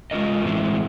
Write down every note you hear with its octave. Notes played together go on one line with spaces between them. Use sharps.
G#3 C#4 F4 A#4 D#5
A2 E3 G#3 C4 E4